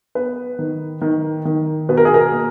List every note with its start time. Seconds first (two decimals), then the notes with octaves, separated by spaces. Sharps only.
0.15 B3 B4
0.59 D#3
1.02 D#3
1.45 D#3
1.89 B2 B4
1.97 A#4
2.05 G#4
2.14 A#4
2.32 A#3